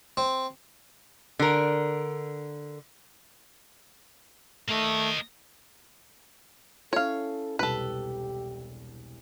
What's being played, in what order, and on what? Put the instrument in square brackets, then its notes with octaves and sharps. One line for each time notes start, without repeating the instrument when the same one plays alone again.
[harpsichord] C4
[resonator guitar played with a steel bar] D3 A#4
[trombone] A3 [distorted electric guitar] A#3 D#5
[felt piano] C#4 E4 [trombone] A4 [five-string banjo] C#5 F5
[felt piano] E1 C2 [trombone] G4 [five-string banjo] A4 B4